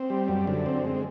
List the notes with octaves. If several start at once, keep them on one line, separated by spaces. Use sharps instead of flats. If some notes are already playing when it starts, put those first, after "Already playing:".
Already playing: C4
G3
F#2
D3
C4
G#3